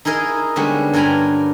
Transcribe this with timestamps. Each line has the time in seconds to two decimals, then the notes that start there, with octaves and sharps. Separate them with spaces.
0.05 D#4 E4 G#4 A#4 D#5
0.56 D3 G3 G#3 B3 C#4
0.94 G2 A#4 G5 G#5 A#5 B5